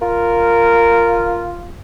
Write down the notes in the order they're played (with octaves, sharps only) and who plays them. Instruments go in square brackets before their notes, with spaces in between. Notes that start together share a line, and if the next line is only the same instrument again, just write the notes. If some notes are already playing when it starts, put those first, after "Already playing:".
[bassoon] F4 [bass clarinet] A#4